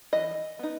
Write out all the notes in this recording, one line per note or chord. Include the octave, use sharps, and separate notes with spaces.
E3 D#5
B3 D#4